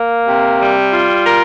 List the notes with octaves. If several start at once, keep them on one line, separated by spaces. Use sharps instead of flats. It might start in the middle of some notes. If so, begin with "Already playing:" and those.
Already playing: A#3
C3
G3
F4
A#4